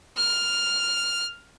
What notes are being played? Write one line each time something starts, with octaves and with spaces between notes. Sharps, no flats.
F6